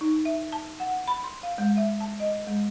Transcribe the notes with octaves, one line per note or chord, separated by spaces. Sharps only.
D#4
E5
A5
F#5
B5
C6
F5
G#3
E5
A5
D#5
G#3